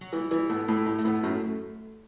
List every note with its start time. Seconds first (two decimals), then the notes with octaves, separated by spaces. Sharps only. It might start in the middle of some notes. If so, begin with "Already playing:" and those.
0.01 F#3
0.13 E3 G3
0.31 E3 G3
0.49 A2 B3
0.68 A2 A3
0.86 A2 G3
0.98 A3
1.05 A2 B3
1.23 F#2 A3